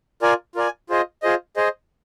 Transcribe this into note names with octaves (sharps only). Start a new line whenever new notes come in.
F4 A#4 D5 G#5
F4 A#4 D5 G#5
F4 G#4 C5 D#5
F4 G#4 C5 D#5
G#4 C5 D#5